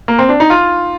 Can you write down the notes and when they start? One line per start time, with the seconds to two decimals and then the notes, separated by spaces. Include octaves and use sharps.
0.08 A#3
0.19 C4
0.29 D4
0.40 D#4
0.50 F4